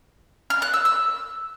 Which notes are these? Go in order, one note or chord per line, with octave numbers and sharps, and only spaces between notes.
F6
F#6
E6
E6